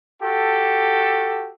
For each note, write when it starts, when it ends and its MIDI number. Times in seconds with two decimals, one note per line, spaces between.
0.22 1.51 66
0.22 1.51 67
0.22 1.51 69